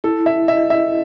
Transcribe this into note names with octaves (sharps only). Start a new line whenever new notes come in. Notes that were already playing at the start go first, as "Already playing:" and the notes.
E4 A4
E5
D#5 E5
E5